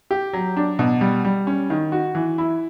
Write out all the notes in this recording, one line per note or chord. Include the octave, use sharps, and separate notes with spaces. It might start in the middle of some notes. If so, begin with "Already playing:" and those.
G4
F#3
D4
B2
G3
G3
C#4
D#3
F#4
E3
E4